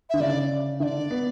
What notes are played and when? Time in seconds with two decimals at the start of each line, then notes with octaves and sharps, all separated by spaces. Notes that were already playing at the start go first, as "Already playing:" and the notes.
0.10 D3 E5
0.20 C#3 D5
0.80 D3 D5 E5
1.11 B3